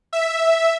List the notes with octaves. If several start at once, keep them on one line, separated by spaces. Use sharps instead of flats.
E5